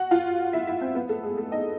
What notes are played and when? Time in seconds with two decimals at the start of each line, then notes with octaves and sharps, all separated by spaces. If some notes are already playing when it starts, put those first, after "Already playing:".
Already playing: F#4 F#5
0.11 F4 F5
0.53 E4 E5
0.67 E4 E5
0.81 C4 C5
0.95 B3 B4
1.09 A3 A4
1.23 G#3 G#4
1.37 A3 A4
1.51 D#4 D#5